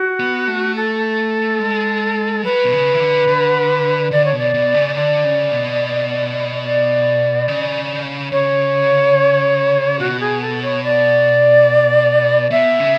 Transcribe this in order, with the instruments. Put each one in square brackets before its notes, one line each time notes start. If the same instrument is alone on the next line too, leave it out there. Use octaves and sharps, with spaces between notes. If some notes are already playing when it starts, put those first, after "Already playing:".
Already playing: [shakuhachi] F#4
[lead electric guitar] B3
A3
[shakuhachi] A4
[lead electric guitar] G#3
[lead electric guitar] F#3 [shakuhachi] B4
[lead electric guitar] B2
C#3
E3
D3
D3
[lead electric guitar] D3 [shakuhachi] D5
[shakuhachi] C#5
[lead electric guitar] B2 [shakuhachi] D5
[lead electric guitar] B2
C#3
[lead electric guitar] D3 [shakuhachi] D5
[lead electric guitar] C#3
B2
[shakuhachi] D5
[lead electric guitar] C#3
[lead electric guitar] C#3 [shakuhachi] C#5
[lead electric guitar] B2 [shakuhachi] F#4
[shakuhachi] G#4
A4
C#5
D5
[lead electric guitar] B2 [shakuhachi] E5
[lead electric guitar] C#3